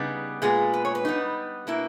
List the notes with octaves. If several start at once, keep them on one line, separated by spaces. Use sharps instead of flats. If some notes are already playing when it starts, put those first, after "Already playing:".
Already playing: C#3 G3 B3 D#4
A#2 G#3 B3 G#4
B4
C#5
B4
G3 B3 D#4
B2 A#3 E4